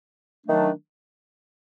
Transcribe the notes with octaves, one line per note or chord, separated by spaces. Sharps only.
D#3 F#3 A3 D4